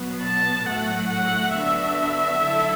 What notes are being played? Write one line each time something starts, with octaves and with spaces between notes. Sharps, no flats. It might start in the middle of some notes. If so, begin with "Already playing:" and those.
Already playing: B2 F#3 B3
A5
A2 F#3 A3 F#4 F#5
F#5
F#2 D3 B3 D4 F#4 E5
D3 F#3 A3 E4 A4